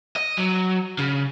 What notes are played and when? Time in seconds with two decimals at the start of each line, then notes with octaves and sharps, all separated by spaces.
0.16 D#5
0.37 F#3
0.99 C#3